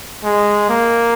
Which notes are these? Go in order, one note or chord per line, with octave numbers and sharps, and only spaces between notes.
G#3
A#3